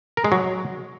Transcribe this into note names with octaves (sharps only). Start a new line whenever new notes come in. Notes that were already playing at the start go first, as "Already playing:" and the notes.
A#4
G#3
F#3